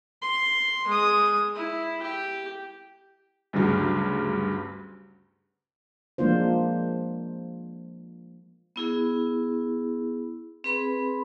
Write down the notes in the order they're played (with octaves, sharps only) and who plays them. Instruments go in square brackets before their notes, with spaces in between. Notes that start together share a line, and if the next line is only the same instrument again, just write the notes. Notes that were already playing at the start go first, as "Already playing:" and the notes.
[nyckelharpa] C6
G#3 D#6
E4
G4
[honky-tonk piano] D2 G2 C#3 F#3 G3
[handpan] F3 G#3 A#3 D4 F4 C5
[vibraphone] B3 E4 G#4
C4 G#4 B4 B5 C6